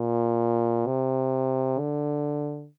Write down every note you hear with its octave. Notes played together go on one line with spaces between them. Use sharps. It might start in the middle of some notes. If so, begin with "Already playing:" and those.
Already playing: A#2
C3
D3